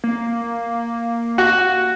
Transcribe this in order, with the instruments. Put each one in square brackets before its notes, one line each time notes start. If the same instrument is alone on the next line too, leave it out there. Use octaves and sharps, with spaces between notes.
[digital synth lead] A#3
[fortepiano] F#4